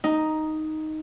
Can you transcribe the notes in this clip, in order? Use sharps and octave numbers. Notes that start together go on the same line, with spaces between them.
D#4